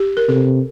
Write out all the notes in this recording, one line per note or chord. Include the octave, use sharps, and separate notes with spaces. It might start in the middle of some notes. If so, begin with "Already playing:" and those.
Already playing: G4
A#4
C3 A4